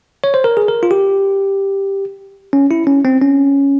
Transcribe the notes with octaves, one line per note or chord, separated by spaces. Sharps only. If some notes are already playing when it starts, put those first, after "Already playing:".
C#5
C5
A#4
G#4
A#4
F4
G4
C#4
E4
C#4
C4
C#4